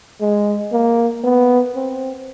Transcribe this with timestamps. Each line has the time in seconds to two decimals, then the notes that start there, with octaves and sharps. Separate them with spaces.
0.21 G#3
0.72 A#3
1.24 B3
1.75 C4